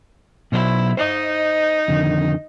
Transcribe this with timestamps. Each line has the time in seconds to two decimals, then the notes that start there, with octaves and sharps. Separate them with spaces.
0.52 B2 F#3 E4 C5
0.97 D#4 C5 D#5
1.88 F2 D3 D#3